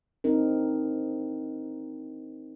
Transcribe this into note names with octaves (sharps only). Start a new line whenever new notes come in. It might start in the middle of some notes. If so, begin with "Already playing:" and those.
C4 D4 D#4 A#4